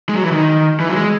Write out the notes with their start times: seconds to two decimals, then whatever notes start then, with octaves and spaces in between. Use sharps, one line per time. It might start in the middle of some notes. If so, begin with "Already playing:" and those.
0.09 G#3
0.16 F#3
0.24 E3
0.31 D#3
0.80 E3
0.89 F#3
0.96 G#3